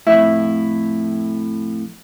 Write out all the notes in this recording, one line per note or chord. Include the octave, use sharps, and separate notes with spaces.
F2 A2 E4